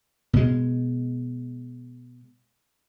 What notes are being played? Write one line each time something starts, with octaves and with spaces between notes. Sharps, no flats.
B2 G#3